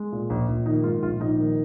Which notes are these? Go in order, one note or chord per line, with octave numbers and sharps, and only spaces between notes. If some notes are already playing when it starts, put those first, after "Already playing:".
Already playing: G#3
A#2
A#1
A#1
D#3 D#4
G#2 F4
A#1 F4
A#1 D#4
D#3